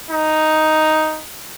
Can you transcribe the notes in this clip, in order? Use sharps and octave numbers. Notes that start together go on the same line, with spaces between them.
D#4